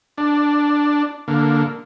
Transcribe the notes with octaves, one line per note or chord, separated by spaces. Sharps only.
D4
D3 A#3